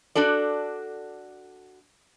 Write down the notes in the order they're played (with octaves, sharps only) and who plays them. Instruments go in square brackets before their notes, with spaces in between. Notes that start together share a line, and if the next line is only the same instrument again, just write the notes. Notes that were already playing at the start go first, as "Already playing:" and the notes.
[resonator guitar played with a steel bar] D4 F#4 A4 D5